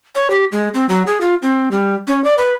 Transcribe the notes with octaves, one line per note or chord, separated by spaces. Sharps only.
C#5
G4
G#3
C4
F#3
G#4
F4
C4
G3
C#4
D5
B4